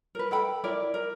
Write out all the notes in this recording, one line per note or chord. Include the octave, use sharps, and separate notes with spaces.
A#4 B4
A4 G5 B5
E4 A#4 D5
A#4